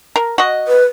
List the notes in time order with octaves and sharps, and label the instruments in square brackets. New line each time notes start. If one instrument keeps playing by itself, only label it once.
[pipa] A#4
F#4 D#5
[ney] B4